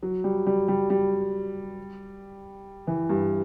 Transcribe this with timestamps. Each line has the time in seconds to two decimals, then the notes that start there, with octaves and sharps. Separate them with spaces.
0.03 F#3
0.24 G3
0.46 G3
0.68 G3
0.90 G3
2.87 E3
3.09 G2